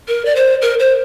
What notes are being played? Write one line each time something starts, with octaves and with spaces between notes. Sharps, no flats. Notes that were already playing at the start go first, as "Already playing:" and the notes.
A#4
D5
C5
A#4
C5